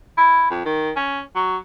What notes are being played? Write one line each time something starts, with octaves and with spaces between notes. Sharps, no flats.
E4
F2
D#3
C#4
F#3